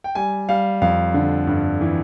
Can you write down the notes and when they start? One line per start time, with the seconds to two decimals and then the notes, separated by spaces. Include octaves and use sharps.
0.04 G5
0.15 G3 G#5
0.49 G3 F5
0.82 F2 F5
1.14 D3
1.47 G2
1.81 E3